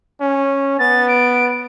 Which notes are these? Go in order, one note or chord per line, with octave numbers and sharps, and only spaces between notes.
C#4
B3 A6
D7